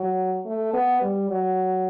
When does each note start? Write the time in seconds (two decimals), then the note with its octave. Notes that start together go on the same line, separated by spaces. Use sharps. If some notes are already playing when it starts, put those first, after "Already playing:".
Already playing: F#3
0.45 A3
0.74 B3
1.01 G3
1.30 F#3